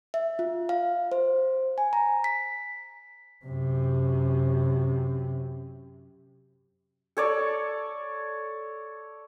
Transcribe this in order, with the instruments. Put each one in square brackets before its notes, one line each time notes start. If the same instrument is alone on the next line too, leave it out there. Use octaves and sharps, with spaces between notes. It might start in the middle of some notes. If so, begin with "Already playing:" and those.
[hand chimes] E5
F4
F5
C5
G#5
A#5
B6
[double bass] F#2 C3
[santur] A4 C#5 D5